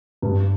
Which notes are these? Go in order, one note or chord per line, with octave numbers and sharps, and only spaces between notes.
G2